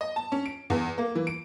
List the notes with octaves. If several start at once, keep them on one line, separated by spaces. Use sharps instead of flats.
D#5
A5
C#4
D7
E2
A#3
E3
D7